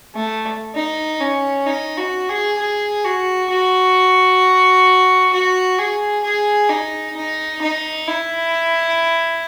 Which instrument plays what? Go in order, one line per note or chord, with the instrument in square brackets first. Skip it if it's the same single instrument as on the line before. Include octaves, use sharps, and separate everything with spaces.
[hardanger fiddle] A3
D#4
C#4
D#4
F#4
G#4
G#4
F#4
F#4
F#4
G#4
G#4
D#4
D#4
D#4
E4